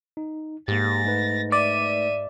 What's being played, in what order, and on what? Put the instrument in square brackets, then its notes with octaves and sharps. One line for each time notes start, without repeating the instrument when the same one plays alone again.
[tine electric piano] D#4
[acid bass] G#2 [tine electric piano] A#3 G4 [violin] A6 A#6
[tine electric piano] A3 D#4 B4
[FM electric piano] D5 [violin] E5 D#7